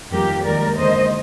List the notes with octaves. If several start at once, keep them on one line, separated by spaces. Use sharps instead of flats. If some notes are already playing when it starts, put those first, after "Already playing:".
F2 D#3 G3 A#3 G4 A#4
D#2 D#3 G#3 A#4 D5
D#2 D3 G#3 C5 D#5